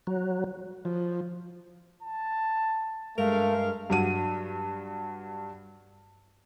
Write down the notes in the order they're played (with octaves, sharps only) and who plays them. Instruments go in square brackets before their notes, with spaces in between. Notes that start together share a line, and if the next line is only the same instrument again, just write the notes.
[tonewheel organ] F#3
[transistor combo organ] F3
[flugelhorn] A5
[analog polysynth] G2 G#3 F5 [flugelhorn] A3 [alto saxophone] A#4
[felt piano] G2 F#3 D#7